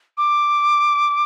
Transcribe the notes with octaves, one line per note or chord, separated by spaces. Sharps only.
D6